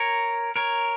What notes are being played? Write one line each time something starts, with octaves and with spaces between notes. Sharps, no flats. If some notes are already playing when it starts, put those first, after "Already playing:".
Already playing: A#4 C#5
A#4 C#5